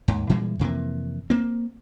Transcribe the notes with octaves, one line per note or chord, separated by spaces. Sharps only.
D#2 G#2
A#2 E3 G3 G#3
F2 C3 E3 A#3
A#3 C4